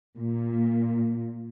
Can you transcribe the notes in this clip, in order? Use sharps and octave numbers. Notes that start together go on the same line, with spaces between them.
A#2